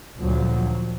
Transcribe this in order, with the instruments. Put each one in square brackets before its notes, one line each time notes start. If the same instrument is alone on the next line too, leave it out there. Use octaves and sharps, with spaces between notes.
[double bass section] D2 A#2 D3 F3 F#3